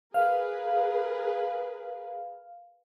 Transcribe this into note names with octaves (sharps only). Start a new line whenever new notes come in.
G#4 A#4 B4 F5